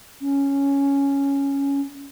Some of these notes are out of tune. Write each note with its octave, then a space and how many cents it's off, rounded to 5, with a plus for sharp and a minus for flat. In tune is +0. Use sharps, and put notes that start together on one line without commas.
C#4 +5